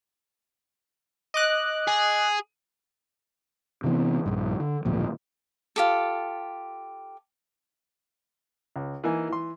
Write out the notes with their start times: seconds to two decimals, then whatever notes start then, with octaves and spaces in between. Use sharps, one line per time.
1.34 D#5 D6 F#6
1.88 G#4
3.84 C3 E3 B3
4.26 A#1 G2
4.60 D3
4.85 D1 G#1 A#2 F3
5.76 F4 G4 A4
8.76 C#2
9.04 E3 A#3 D#4 G#5
9.29 E3 C6